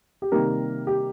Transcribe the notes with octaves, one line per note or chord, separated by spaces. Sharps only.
G4
C3 D#3 G3 A#3 A#4
G4